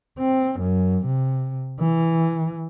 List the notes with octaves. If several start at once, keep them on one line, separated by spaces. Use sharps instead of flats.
C4
F#2
C3
E3